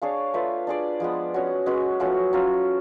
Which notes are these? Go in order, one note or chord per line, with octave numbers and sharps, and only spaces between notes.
D4 G#4 C#5 F5
A3 F4 B4
D4 G#4 D5
F3 G#3 B3
C#4 F#4 C#5
G#3 C#4 F#4 B4
F3 A3 C#4 F#4
F#3 C#4 F4